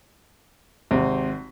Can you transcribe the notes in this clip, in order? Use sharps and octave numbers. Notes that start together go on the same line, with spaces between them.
G#1 C3